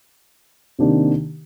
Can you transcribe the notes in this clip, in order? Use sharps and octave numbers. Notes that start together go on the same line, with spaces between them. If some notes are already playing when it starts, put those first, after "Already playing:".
C3 D#3 A#3 D4 G4